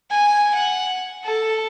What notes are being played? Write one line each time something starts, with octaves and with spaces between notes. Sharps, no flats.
G#5
F#5
A4